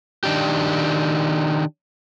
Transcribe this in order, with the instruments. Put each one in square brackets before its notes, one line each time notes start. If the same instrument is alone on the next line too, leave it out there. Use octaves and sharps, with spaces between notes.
[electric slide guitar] D#3 D4 G4